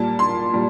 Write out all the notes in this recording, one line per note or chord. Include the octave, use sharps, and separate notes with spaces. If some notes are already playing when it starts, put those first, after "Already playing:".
Already playing: A#2 G3 A#3 A5
C6
A#2 G3